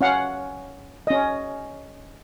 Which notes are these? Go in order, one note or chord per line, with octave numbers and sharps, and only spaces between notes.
C#4 F5 F#5
C#4 D#5